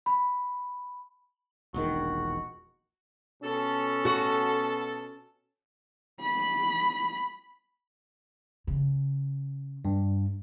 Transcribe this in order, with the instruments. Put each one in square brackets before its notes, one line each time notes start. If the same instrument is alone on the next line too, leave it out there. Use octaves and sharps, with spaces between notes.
[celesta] B5
[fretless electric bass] E1 A#1 D#3 [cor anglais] F#4
[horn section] B2 A4 [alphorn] C#4
[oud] F#4
[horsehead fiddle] B5
[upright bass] C#3
[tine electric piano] G2